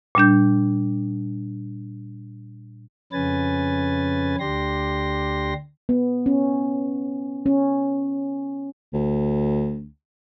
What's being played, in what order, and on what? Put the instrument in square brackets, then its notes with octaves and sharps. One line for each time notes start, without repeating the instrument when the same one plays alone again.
[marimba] A#2 G3 D4 G6
[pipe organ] F2 C#3 C#4 B4 G#5 A6
D2 D4 G4 C6 A#6
[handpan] B3
C#4
C#4
[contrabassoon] D2